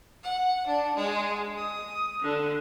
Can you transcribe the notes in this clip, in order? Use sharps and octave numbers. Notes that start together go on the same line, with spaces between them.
F#5
D4
G#3
D#6
D3